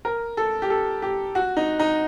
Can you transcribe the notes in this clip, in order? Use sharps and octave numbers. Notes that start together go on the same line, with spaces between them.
A#4
A4
G4
A4
G4
F#4
D#4
D#4